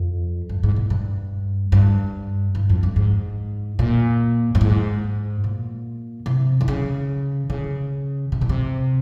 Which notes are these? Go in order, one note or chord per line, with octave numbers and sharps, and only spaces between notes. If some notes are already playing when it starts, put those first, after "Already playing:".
Already playing: F2
G2
G#2
A#2
G2
G2
G2
F2
G2
G#2
A#2
G2
G#2
A#2
C3
D#3
C#3
C#3
C3
A#2
C3